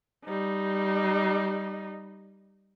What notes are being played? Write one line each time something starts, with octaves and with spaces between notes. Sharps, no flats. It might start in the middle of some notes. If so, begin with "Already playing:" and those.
G3 D#4